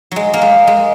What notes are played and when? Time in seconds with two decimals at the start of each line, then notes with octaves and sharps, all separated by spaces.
0.11 F#3 G#3
0.34 A#3
0.42 G#3
0.67 G#3